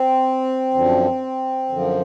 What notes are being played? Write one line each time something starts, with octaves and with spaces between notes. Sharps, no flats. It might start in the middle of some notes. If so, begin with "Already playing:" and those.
Already playing: C4
F#2 D3 F3
F#2 D3 F3